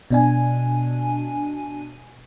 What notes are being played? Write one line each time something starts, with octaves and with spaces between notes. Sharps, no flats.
B2 D4 G#5